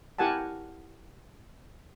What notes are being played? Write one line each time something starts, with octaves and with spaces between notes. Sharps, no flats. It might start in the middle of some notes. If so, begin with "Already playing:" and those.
E4 G4 A#4 F#5 G#5 A5